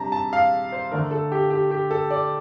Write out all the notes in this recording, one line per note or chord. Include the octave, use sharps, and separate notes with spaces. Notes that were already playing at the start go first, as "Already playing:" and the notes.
Already playing: C3 G3 D4 A5 A#5
A5
F5
C5
D3 A3 D4 A#4
A4
G4
G4
G4
A4
D5